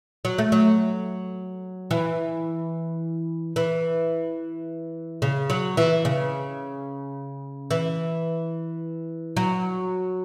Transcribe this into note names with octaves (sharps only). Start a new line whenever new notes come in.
F#3
A3
F#3
E3
E3
C#3
F#3
E3
C#3
E3
F#3